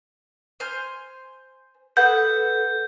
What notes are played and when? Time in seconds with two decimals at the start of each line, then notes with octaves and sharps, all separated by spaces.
0.60 C5 G#5 F6
1.97 A4 B4 F#5 D#6 G6